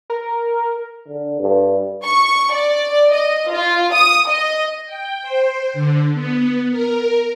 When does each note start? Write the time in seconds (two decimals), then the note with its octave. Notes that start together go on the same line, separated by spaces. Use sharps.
0.10 A#4
1.08 D3
1.40 G2
2.04 C#6
2.52 D5
3.12 D#5
3.50 F4
3.93 D#6
4.28 D#5
4.86 G5
5.22 C5
5.74 D3
6.14 B3
6.71 A#4